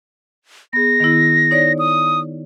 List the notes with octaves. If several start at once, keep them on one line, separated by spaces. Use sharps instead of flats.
B3 G#4 A#6
D#3 B3 E4
D#4 C#5 D5
D#6